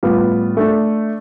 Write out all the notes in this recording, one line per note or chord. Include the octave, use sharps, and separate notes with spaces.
A2 G3 B3 F4
A3 D4 A4